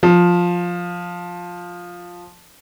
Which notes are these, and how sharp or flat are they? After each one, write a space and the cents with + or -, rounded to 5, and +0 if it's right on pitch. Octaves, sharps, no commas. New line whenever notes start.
F3 +10